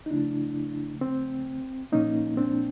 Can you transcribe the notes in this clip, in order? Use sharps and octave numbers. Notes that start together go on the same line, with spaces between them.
D#4
C#3 F3 A3 D4 E4
C4
A#2 F3 A#3 C#4 D#4
C4 D4